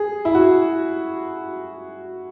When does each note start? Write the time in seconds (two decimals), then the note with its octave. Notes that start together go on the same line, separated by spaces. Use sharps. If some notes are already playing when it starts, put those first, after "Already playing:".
Already playing: G#4
0.25 E4
0.35 F#4